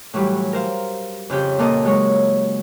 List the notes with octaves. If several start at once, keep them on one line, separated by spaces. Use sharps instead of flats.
A2 E3 F#3 G3
A#4 C5 F5
F2 C#3 G4 G6
A#2 A#3 A4 A#4 D#5 D#6
F#3 G#3 C#5